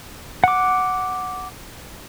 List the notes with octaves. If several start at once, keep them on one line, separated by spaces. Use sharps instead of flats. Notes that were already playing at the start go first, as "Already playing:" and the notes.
F#5 D6